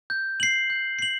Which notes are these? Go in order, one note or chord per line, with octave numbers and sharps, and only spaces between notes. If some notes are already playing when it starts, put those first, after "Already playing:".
G6
C7 F#7
G6
C7 F#7